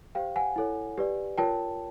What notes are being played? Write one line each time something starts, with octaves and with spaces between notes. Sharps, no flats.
G4 C5 F5 G5
F#5 G#5
E4 A4 C#5
G4 B4 D5
F4 A#4 C#5 G5 A5